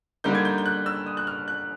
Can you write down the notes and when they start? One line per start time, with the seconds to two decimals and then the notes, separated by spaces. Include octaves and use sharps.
0.24 D3 G3 A#3 D#4 G6
0.35 G#6
0.45 G6
0.58 G6
0.66 F#6
0.86 E6
1.06 D#6
1.17 F#6
1.27 F6
1.48 F#6